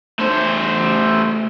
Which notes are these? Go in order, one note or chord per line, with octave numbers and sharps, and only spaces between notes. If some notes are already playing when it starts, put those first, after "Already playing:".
A3 C5